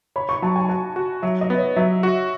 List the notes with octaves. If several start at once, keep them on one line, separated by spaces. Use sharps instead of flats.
C#5 B5
C#6
F#3 A5
G#5
F#4 A5
F#4
F#3 E5
D#5
B3
C#5
F#3 E5
F#4